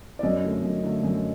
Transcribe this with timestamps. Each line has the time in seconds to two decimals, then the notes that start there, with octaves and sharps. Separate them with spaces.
0.19 D5
0.23 F#2 D#5
0.43 D3 A3
0.63 F#2
0.83 D3 A3
1.03 F#2